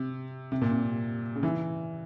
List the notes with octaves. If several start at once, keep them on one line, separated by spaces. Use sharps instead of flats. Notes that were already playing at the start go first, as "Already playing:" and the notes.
Already playing: C3
C3
A#2
C3
C#3
E3